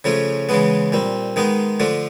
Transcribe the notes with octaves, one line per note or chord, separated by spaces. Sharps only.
C#3 F3 A3 C#4
C#3 E3 G#3 B3
A#2 G3 C4
D#3 G#3 B3 D#4
D3 F3 A3 D4